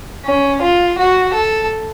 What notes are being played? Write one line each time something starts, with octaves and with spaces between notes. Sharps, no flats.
C#4
F4
F#4
A4